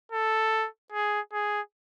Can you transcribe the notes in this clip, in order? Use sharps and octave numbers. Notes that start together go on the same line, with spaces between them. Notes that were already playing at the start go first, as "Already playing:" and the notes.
A4
G#4
G#4